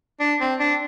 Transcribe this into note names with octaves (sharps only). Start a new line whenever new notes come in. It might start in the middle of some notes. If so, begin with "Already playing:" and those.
D4
C4
D4